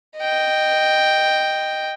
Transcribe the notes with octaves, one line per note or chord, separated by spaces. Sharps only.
D#5 G5